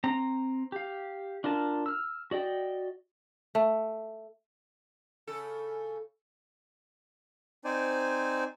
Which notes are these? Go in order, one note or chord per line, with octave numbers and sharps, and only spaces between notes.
C4 A#5
G4 F5
D4 F4 A#4 A5
E6 F6
F#4 D5 D#5 G5
A3
C#3 A4
C4 D#4 C5 D5 G#5